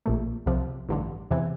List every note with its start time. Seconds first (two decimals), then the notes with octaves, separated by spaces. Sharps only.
0.06 A#1 A#2 A3
0.46 C2 C3 F3
0.89 A1 G2 D3
1.31 E2 C3 E3